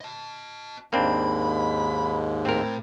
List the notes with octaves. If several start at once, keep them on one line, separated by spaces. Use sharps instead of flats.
D#5 A5
D#2 G#2 A#3 C4 D4 B5
A2 C4 A#4